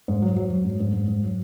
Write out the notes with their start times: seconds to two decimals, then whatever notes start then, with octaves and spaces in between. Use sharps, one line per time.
0.08 G#2
0.22 F#3
0.36 F#3
0.50 F#3
0.65 G#2
0.80 G#2
0.93 G#2
1.08 G#2
1.23 F#3